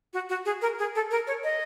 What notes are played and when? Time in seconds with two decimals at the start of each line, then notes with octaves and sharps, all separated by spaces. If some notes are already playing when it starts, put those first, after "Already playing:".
0.13 F#4
0.29 F#4
0.45 G#4
0.62 A#4
0.79 G#4
0.95 A4
1.11 A#4
1.27 C#5
1.44 D#5